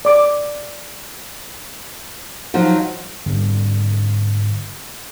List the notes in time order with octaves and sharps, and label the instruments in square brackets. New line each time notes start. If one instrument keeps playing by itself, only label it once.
[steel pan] D5 D6
[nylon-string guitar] F3 F#3 D#4
[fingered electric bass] G#2 D3 G3 C4